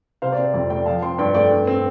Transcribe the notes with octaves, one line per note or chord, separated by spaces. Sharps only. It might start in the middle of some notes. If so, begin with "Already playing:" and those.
C3 C5 F5
D5
C4
C5
F2 D5
A3 D5 G5
F3 F5 A5
C4 G5 C6
G2 D5 G5
A3 D5 G5
G2
C4